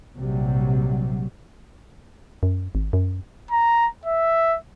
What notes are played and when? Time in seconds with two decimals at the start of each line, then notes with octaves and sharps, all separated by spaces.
0.17 A#1 C3 F#3 G3
2.43 F#2
2.75 G#1
2.93 F#2
3.51 A#5
4.06 E5